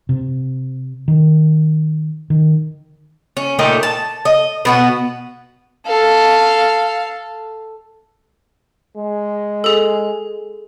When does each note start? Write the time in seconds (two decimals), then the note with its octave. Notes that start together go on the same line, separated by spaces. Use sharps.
0.09 C3
1.08 D#3
2.30 D#3
3.37 C#4
3.59 A#2 A3 D#4 G5
3.83 A5
4.25 D#5
4.65 B2 B3 F#4
5.85 A4 F5
8.96 G#3
9.64 G#4 A4